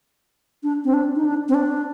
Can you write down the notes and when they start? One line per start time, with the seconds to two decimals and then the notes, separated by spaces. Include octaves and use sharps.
0.63 D4
0.85 C4
0.94 D4
1.15 D#4
1.25 D4
1.49 C4
1.54 D4